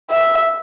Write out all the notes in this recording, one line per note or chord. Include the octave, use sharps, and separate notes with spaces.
E5